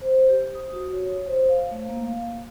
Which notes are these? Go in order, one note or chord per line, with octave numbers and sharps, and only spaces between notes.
C5
G4
D#6
F#4
C#5
C5
F5
A3
A#3
F5